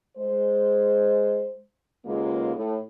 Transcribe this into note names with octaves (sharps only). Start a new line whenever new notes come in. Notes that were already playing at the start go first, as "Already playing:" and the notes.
G#3 C5
D#2 C#3 G#3 A#3 B3 F4
A2